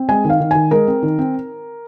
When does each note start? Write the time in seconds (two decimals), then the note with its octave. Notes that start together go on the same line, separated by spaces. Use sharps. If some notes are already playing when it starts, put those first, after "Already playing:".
Already playing: C4
0.09 G#3 G#5
0.25 D#3
0.30 F5
0.40 D#3
0.51 D#3 G#5
0.71 G#3 A#4
0.88 C4
1.03 D#3
1.19 C4